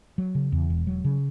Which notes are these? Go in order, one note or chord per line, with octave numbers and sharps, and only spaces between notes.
F#3
C#3
E2
E1
F#3
C#3